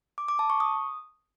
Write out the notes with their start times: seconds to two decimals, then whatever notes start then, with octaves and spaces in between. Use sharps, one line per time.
0.18 D6
0.28 D6
0.39 A5
0.50 C#6
0.60 D#6